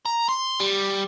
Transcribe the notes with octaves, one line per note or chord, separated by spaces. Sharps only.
A#5
C6
G3